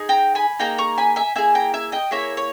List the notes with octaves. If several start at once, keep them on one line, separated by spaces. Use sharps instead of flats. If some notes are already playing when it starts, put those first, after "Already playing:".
Already playing: D#4 G#4
G5 A#5
G#5 B5
A#3 D#4 G#4 G5 A#5
A#5 C#6
G#5 B5
E5 G#5
A#3 E4 G#4 E5 G#5
G5 A#5
E5 G#5
D#5 G5
A#3 E4 G#4 C#5 E5
C#5